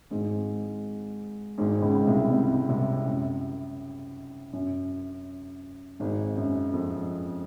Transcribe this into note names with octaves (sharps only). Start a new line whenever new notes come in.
G#1 G#2
G#1 G#2
C#2 C#3
C2 C3
C2 C3
C2 C3
F#2
F#2
G#1 G#2
F#2
F2